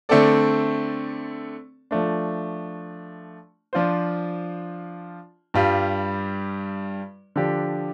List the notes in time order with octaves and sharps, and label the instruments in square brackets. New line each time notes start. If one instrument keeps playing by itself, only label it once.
[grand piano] D3 A3 C4 A4 D5
F3 A3 D4
F3 D4 F4 C5
G2 G3 F4
D3 F3 D4 G4